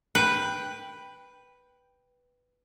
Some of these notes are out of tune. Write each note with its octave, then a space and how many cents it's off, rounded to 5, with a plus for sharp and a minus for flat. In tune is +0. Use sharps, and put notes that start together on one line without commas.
B4 +0 G5 +0